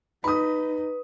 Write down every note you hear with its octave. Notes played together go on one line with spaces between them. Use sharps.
D#4 B4 B5 D#6